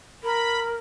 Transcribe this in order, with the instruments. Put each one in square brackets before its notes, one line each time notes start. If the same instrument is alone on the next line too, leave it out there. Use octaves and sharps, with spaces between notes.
[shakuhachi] A#4 [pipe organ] B5